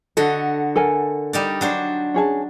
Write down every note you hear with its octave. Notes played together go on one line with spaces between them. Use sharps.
D3 F#4 A4 D#5
A4 A#4 G#5
G3 D#4 D5
F#3 D4 C5
C#4 G#4 A5